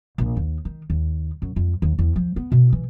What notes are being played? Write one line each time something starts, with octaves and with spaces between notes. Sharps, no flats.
A#1
D#2
D#3
D#2
F#2
F2
D#2
E2
F3
B3
B2
E3